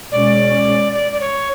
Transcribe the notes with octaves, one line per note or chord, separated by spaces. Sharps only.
B2 G#3 C#4 D5
D5
D5
C#5